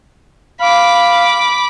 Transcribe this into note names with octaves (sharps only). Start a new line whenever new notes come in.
F5 B5 D6